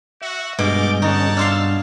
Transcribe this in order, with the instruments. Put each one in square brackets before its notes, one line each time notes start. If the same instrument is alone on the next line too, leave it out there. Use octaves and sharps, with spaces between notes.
[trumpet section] F#4 [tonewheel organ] E5
[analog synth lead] G2 [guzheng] B2 [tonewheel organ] G#3 G6 [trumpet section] A#4 D5 D6
[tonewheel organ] D3 C#4 [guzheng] D#4 [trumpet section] C#5 F#5 A5
[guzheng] D4 F4 F5 [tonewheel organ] E6 F6